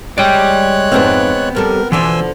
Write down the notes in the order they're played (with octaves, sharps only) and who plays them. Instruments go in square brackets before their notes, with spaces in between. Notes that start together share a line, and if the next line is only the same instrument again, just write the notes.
[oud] G3 [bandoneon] G#3 C#5 F#6 [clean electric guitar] D5 G5
[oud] F2 G#2 F5 [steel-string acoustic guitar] B3 C4
[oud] F2 G3 A4 [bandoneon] A#4
[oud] B2 D3 F3 [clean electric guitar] E3 [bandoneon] G#5 C6 E6